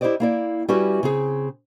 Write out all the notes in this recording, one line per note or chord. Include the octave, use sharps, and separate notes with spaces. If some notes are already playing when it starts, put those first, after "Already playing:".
E4 G4 G#4 C5 D5 D#5
A#3 E4 D5
G3 C#4 E4 F#4 G4 B4
C#3 C4 G#4